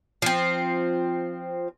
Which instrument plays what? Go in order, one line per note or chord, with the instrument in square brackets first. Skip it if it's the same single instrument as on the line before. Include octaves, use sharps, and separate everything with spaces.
[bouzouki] F3 C4